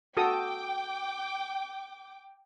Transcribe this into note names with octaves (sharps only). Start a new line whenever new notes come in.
F#4 A4 G5 D6 D#6